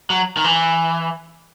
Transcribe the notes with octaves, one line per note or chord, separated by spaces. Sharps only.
F#3
D#3
E3